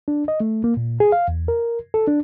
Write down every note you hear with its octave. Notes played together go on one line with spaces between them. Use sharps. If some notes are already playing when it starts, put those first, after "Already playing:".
D4
D#5
A3
A#3
A#2
G#4
F5
E2
A#4
A4
D4